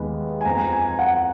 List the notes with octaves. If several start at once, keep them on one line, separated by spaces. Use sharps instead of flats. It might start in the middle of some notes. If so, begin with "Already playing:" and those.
Already playing: D#2 D#3 G#3 B3
G#5
F2 F3 B3 A#5
G#5
F#5